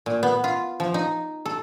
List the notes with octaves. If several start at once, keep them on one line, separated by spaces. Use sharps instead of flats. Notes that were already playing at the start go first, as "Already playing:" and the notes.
A#2
B3
F4
F3
D#4
A4